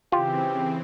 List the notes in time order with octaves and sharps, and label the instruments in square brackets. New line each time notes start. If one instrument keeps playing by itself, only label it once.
[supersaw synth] C#3 E3 C4 [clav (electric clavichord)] F4 [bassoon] G4